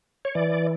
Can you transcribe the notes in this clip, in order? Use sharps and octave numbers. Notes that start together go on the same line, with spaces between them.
C#5
E3 D5